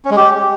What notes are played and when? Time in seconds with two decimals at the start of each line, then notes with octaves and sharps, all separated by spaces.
0.05 C#4
0.11 G#3
0.17 G4